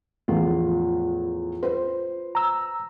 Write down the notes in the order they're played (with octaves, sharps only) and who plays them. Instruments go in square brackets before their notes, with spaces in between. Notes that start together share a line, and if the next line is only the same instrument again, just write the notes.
[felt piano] E2 A2 F3 [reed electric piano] F4
[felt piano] B4 C5
[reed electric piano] A#5 E6